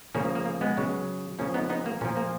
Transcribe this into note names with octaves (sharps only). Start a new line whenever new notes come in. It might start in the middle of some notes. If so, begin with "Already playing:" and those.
C#3 F3 A#3 C#4
A#3
A#3
A#3
G#3 B3
C#3 F#3
C#3 F3 A#3 C#4
B3 D#4
B3 D#4
A#3
A#2 F3 A#3 C#4
A#3